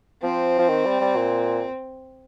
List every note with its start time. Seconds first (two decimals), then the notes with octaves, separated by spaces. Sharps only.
0.23 F3 C4
0.58 F3
0.69 D#3
0.86 G3
1.01 G3
1.17 A#2